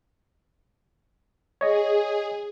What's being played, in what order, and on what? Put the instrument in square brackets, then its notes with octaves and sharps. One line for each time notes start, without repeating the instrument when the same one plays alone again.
[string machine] G#4 [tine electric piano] C#5 D#5